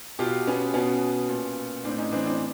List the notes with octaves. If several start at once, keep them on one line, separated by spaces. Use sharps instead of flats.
B2 F4 G4
B3 C#4
B2 B3 C#4
A#2
A2 C4 D4
C#4 D#4
E3 C4 D4
C4 D4